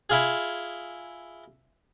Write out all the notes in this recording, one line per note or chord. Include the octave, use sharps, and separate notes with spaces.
E4 F4 G#4